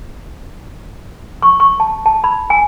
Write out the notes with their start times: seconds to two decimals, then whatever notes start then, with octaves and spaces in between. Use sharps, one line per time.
1.42 C#6
1.60 C#6
1.80 A5
2.06 A5
2.24 B5
2.50 G#5